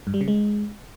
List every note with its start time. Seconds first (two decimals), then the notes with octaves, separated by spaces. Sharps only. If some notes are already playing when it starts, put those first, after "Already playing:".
0.07 G2
0.14 G3
0.21 C#3
0.28 G#3